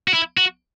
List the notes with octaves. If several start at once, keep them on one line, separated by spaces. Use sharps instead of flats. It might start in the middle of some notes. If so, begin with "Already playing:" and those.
F#4
E4
F#4